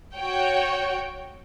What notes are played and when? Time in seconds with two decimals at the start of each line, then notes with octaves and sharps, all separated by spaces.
0.15 F#4 C#5 G5